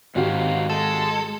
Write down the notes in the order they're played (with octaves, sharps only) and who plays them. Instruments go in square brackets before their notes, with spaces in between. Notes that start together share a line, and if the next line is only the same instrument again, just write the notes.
[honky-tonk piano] G#1 F#4 G4 [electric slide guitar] G#2 C4 F5
[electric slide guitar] G#3 [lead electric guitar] A4